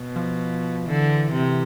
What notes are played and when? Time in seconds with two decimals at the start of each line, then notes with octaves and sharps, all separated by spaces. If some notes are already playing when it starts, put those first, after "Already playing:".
Already playing: B2
0.16 F3
0.86 D3 E3
1.33 C3